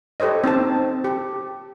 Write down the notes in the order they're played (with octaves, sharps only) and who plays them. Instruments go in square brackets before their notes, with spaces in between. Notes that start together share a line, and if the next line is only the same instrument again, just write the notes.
[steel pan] G4 A4 C5 C#5 D#5
C4 D#4 C5 A5
G4